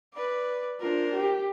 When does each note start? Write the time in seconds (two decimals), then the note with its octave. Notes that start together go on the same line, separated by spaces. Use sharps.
0.14 B4 D5
0.80 D4 F4 A#4 C5
1.14 G4